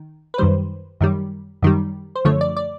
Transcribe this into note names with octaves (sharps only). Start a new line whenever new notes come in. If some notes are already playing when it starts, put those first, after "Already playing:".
Already playing: D#3
B4
F#2 D#3 G3 C5
F#2 D#3 G3
F#2 D#3 G3
C5
F#2 D3 F3 A3 C#5
D5
D5